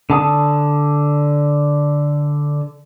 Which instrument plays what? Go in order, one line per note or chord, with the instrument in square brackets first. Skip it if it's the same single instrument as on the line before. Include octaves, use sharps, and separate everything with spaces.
[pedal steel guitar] D3 A5 D#6